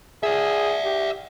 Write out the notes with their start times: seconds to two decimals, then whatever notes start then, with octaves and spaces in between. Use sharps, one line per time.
0.23 G#4 D5 E5
0.84 G4